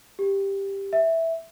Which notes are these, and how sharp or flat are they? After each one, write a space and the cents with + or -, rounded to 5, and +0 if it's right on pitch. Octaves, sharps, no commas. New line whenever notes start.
G4 +5
E5 -5